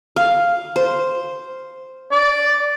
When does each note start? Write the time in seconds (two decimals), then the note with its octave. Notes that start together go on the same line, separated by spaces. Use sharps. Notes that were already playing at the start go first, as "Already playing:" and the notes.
0.16 F5
0.76 C5
2.12 D5